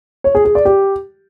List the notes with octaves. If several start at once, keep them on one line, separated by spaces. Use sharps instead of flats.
C#5
G#4
G#4
D5
G4